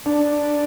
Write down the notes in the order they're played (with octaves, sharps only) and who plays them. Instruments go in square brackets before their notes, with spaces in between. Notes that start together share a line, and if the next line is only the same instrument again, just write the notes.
[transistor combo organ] D4